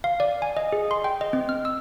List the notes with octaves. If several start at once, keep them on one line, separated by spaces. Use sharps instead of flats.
F5
D5
G#5
D#5
G#4
C6
G5
D#5
C4
F6
E6